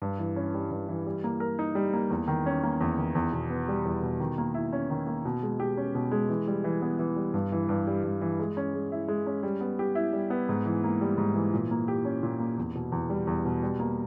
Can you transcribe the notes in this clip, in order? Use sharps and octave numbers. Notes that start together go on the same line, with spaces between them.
G2
E3
C#4
G3
G2
E3
G3
A#3
A#4
D#4
G3
A#3
E2
D#3
C#4
A#3
E2
D#3
E2
B2
B3
G3
E2
B2
D#3
A#3
E4
C#4
D#3
A#3
B2
G#3
G4
C#4
B2
G#3
E3
G3
E3
B3
E3
G3
G2
E3
G2
G3
G2
E3
G#3
C#4
G#3
E4
G#3
C#4
G3
B3
G4
E4
G3
B3
G#2
E3
A#3
G3
G#2
E3
A#2
A#3
G4
C#4
A#2
A#3
E2
B2
E2
G3
E2
B2
G3
A#3